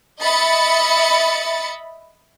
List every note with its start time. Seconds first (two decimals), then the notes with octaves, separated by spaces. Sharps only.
0.20 D#5 E5 B5 A6 C#7